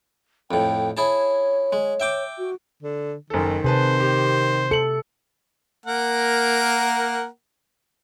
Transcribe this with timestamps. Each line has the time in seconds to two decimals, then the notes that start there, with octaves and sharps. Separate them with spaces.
0.51 F2 A2 G5
0.97 E4 G#4 C#5 A5
1.73 G#3
2.00 E5 G5 D6
2.38 F#4
2.83 D3
3.30 F#1 D#3 A4
3.64 C3 G#4 B4 C5 A5
4.00 G4
4.71 A4 C#7 F#7
5.86 A#3 A#4 F#5